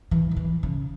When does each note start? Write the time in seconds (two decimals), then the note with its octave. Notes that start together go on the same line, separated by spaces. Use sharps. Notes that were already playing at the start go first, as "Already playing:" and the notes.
0.11 E3
0.31 D#3
0.36 E3
0.63 C#3